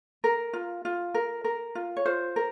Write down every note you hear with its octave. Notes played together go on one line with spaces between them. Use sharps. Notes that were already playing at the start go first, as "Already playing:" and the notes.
A#4
F4
F4
A#4
A#4
F4
C#5
F4 C5
A#4